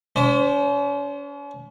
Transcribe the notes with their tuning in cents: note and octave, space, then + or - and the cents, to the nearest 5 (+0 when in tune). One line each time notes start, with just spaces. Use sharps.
C#4 +45 C5 +0